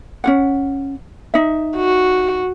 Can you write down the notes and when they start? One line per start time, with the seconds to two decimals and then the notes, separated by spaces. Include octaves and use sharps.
0.24 C#4 F4 F#5
1.34 D#4 E5
1.77 F#4